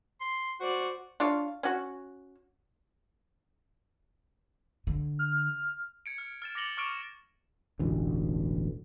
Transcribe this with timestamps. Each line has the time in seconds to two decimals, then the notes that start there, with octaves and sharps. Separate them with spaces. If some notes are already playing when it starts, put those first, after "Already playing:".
0.21 C6
0.60 F#4 C5 D5
1.20 D4 F4 C#5 F5
1.63 C#4 F#4
4.87 D3
5.19 F6
6.06 G#6 C#7 D7
6.18 F6
6.42 F6 A6 E7
6.55 D6 A6 A#6 C#7 F#7 G7
6.77 C#6 D6 F6 C#7 D7 E7
6.89 E7
7.79 E1 A1 D2